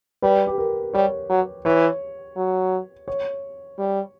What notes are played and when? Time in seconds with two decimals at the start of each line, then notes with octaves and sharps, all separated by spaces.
0.22 G3 B4
0.47 G4
0.58 A#4
0.94 G3 C#5
1.30 F#3
1.65 E3 C#5
2.37 F#3
3.08 C#5
3.79 G3